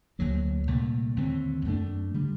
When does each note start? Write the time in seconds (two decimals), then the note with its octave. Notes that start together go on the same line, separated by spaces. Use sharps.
0.19 D2 D3 F#3 A#3
0.67 C2 A#2 A3
1.16 D#2 D3 A3 C4
1.65 F#2 F#3 A3 D4
2.14 D3 G3